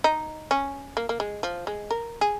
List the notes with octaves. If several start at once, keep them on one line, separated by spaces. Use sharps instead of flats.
D#4
C#4
A#3
A#3
G#3
F3
G#3
A#4
G#4